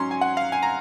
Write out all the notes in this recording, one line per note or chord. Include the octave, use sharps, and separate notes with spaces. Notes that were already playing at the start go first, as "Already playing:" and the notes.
Already playing: G#2 F#3 C#4 C6
G#5
F#5
F5
G#5
A#5